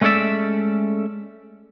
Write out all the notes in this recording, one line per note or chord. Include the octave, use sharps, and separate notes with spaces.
G#3 A3 C#4 A4 D5 E5